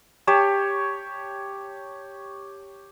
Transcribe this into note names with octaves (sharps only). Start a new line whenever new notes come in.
G4 C#5 A5